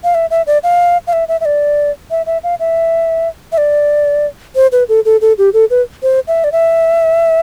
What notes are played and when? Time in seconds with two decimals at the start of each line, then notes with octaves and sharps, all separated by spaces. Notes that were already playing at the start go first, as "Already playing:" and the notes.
0.04 F5
0.15 E5
0.31 E5
0.47 D5
0.63 F5
1.07 F5
1.13 E5
1.28 E5
1.41 E5
1.45 D5
2.11 E5
2.26 E5
2.44 F5
2.60 E5
3.52 E5
3.58 D5
4.56 C5
4.72 B4
4.89 A4
5.05 A4
5.21 A4
5.38 G4
5.54 A4
5.70 B4
6.03 C5
6.28 E5
6.44 D5
6.52 E5